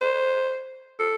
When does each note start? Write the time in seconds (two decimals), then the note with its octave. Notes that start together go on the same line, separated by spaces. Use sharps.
0.01 C5
0.99 A4